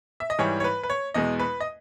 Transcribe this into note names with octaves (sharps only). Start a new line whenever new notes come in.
E5
D#5
G#2 E3 G3 C#5
C#5
B4
B4
C#5
E2 B2 G#3 D#5
B4
D#5